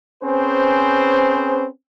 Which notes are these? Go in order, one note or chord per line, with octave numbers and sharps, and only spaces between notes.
C4 C#4 G#4 B4 C5